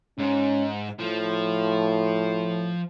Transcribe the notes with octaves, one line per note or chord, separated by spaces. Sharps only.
G#2 C#4
A2 F3